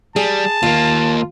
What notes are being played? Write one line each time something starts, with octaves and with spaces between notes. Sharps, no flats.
G3 G#4 A5
D#2 A#3 F4